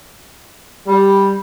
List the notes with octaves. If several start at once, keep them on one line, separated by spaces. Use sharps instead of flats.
G3